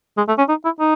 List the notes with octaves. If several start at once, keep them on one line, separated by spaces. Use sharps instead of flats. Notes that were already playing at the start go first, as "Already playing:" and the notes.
G#3
A3
C#4
D#4
E4
D#4